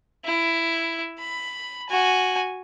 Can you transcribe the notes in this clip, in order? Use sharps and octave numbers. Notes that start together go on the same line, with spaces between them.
E4
B5
F#4 G#5